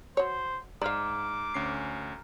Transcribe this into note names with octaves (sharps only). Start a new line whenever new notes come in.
F#3 C5 C#5
G#2 D5 F5 A#5 D6 F6
D2 C#4 C7